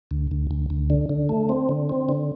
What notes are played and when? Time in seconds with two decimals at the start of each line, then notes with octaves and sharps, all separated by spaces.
0.11 D2
0.31 D2
0.51 D2
0.70 D2
0.90 D3
1.09 D3
1.29 A3
1.49 C4
1.69 D3
1.89 C4
2.09 D3